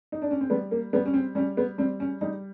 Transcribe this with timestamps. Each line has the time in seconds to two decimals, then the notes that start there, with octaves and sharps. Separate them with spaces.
0.12 D#4
0.22 D4
0.31 C#4
0.41 C4
0.50 G3 B3
0.71 A#3
0.93 G3 B3
1.06 C#4
1.14 C4
1.35 G3 C#4
1.57 B3
1.78 G3 C4
2.00 C#4
2.21 G3 D#4